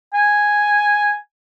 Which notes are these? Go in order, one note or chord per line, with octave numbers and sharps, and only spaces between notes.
G#5